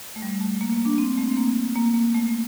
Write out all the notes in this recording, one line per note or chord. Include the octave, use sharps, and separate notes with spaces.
A3
G3
A3
A#3
A#3
D4
C4
A3
C4
A#3
A#3
A#3
A3